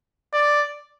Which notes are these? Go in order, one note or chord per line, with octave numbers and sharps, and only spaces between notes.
D5